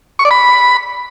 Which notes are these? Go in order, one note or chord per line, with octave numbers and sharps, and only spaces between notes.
C#6
D5
B5